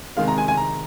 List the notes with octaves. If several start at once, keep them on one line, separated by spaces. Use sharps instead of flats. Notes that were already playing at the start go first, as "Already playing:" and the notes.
C3 D#3 G#3 F5
A#5
G#5
G#5
A#5